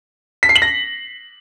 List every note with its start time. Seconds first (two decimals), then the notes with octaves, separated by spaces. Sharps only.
0.43 B6
0.49 C7
0.56 F#7
0.62 A#6